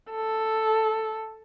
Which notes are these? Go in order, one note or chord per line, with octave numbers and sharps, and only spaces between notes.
A4